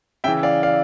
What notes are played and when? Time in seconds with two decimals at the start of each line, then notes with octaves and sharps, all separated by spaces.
0.24 C#3 E3 E5 G5
0.43 D5 F5
0.63 D5 F5